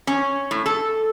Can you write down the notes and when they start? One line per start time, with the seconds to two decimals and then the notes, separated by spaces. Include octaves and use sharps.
0.07 C#4
0.51 A2
0.66 A4